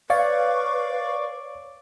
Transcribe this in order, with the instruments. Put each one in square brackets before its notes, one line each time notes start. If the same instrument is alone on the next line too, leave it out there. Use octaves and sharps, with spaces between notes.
[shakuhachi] B4 [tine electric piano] C#5 [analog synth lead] D5 [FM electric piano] F5 C#6